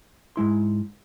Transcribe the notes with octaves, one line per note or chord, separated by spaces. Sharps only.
G#2 G#3 E4 C6